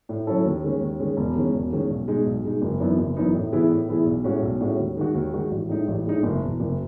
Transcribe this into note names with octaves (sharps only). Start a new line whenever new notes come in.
A2
F#3 C#4 E4 A4
D#2
D#3 G#3 C#4
D#2
D#3 G#3 C#4
E1
E2 D#3 G#3 C#4
E1
E2 D#3 G#3 C#4
B1
B2 G#3 D#4
B1
B2 G#3 D#4
F#1
F#2 E3 B3 D#4
F#1
F#2 E3 B3 D#4
A2
E3 B3 E4 G#4
A2
E3 B3 E4 G#4
B1
A2 G#3 C#4 F#4
B1
A2 G#3 C#4 F#4
D#2
D#3 G#3 D#4 F#4
D#2
D#3 G#3 D#4 F#4
A1
A2 G#3 D#4
A1
A2 G#3 D#4
F#1
E2 B2
F#1